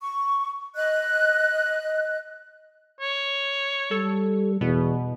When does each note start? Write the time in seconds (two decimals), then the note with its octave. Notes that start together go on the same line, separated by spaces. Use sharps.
0.01 C#6
0.76 D#5 F#6
3.01 C#5
3.91 G3 A4
4.61 E2 B2